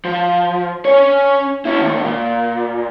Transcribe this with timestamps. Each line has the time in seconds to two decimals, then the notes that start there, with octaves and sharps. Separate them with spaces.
0.05 F3
0.85 C#4 C#5
1.65 C#4 E4
1.81 D2 D#3
2.05 A#2